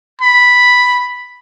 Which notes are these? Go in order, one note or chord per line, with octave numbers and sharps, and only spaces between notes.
B5